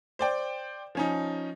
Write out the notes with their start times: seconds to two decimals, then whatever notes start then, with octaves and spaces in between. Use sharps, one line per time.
0.19 C5 D5 G5
0.95 F3 C#4 D#4